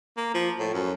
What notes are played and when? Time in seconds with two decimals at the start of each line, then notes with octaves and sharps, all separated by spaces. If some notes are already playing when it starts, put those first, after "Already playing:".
0.17 A#3
0.34 F3
0.59 A2
0.74 F#2